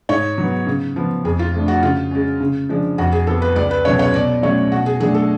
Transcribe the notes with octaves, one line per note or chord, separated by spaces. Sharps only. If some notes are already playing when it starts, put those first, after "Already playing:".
G#2 C#5
F#3 B3
C#3
F3 B3
F2 G#4
F4
F3 A3 D4
F#4
C#3 F4
G#3 C#4
C#3
F3 G#3 D4
F2 F#4
G#4
F3 B3 A4
B4
C#2 D5
B4
B2 F#3 C#4 C#5
C#5
B2 D5
F#3 A3 C#4 C#5
B2 F#4
G#4
F#3 A3 D4 G#4
A4